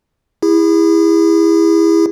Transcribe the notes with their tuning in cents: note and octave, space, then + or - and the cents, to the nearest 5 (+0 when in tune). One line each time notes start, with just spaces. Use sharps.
E4 +0 G#4 -35